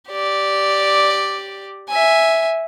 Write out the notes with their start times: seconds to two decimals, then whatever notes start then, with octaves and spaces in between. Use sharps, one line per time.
0.10 G4 D5
1.90 E5 G#5